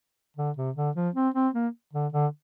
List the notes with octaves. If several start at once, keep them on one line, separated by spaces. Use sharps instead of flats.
D3
C3
D3
F3
C4
C4
A#3
D3
D3